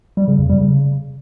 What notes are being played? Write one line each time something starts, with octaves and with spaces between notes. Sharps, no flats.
G3
C#3
F2
G3
C#3